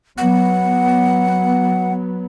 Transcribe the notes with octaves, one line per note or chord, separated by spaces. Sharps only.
F#3 B3 F#5